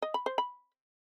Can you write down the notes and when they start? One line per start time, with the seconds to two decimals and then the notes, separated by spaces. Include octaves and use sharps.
0.02 D#5
0.14 B5
0.26 C5
0.38 B5